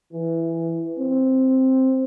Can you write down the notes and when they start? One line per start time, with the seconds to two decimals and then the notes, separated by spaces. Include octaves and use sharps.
0.13 E3
0.99 C4